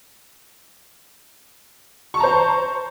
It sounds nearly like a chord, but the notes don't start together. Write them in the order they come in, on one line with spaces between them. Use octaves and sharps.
C#6 A5 A#5 C5